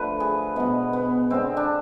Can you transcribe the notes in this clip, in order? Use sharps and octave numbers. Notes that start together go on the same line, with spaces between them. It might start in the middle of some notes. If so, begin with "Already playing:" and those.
Already playing: D3 F3 A3 B4
G#4
B2 G#3 B3
B3
D3 G#3 C4
D4